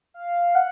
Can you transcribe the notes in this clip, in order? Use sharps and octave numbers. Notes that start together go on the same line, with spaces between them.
F5
F#5